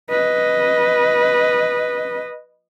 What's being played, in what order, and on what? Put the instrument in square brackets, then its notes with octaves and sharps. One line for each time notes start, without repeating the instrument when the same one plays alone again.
[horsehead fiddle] B4 D#5